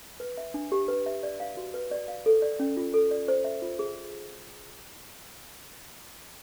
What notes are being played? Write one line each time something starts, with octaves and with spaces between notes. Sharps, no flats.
B4
E5
D4
G4
B4
E5
D5
F5
F#4
B4
D5
F5
A4
D5
C#4
F4
A4
D5
C5
E5
F4
G#4